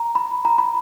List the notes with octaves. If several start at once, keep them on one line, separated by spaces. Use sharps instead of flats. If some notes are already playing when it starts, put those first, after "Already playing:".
Already playing: A#5
B5
A#5
B5